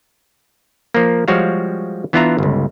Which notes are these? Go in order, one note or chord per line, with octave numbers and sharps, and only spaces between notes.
F3 A#3
F3 G3 G#3 F#4 C#5 F5
E3 B3 D4 F4 E5 A#5
G1 C#2